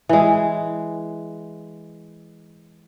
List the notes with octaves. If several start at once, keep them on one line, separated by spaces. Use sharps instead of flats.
E3 G#3